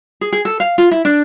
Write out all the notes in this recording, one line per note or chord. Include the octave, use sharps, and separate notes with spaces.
G#4
G#4
A4
F5
F4
E4
D4